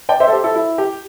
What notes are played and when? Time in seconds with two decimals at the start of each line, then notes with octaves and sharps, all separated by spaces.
0.09 D5 G5
0.20 C5 E5
0.27 A4
0.32 G4 C5
0.44 E4 A4
0.55 E4
0.78 G4